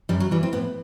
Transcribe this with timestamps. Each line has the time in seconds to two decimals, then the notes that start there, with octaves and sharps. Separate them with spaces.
0.09 F#2 G3
0.20 F#3
0.31 E3 G3
0.43 C4
0.53 A2 B3